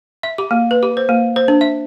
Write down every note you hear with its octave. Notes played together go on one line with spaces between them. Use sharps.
E5
G4
A#3
B4
G4
C5
A#3
C5
D4
E5